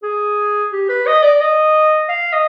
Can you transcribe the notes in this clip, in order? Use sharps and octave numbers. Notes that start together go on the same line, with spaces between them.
G#4
G4
B4
D#5
D5
D#5
F5
D#5